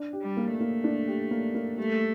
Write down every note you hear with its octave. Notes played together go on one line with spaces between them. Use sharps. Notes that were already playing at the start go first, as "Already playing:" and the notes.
Already playing: D4
G4
G3
A#3
A3
A#3
D4
G4
A#3
A#3
G3 A3